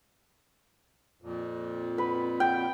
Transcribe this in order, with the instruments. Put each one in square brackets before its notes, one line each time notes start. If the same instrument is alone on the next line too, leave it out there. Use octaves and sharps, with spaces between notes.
[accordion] F2 A#2
[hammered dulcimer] B4
G5